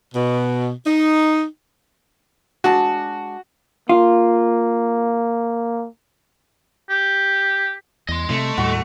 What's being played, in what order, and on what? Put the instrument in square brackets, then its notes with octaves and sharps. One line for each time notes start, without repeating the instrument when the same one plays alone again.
[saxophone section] B2
D#4
[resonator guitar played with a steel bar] G#3 D4 A5 [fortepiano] F#4
[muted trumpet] A#3 [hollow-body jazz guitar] F4
[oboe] G4
[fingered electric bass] E2 [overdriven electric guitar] D#5 C6
[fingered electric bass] C3 [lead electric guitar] A3
[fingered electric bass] D#2 A2 G3 [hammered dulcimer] F#4